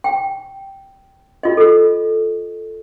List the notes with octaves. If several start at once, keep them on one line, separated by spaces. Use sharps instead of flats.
G5
F4 D#5
A4